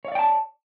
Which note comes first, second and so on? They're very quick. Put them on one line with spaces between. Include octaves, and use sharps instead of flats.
C#5 F5 D5 G5 A5